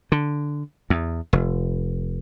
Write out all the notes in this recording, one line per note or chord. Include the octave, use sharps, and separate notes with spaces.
D3
E2
F1